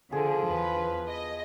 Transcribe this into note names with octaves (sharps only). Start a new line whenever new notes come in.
D3 F3 G#4
E2 B4
D#5